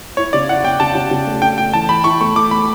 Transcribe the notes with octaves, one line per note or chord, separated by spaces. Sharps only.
E4 C#5
C#3 D5
E4 F#5
C#3 G5
C#3 A5
C#3
C#3
A3
C#3 G5
A3 G5
E3 A5
E3 B5
E4 C#6
A3 C#6
E3 D6
A3 B5